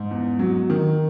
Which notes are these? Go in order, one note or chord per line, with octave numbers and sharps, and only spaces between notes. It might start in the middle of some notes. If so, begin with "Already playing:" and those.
Already playing: G#2
E2
F#3
D#3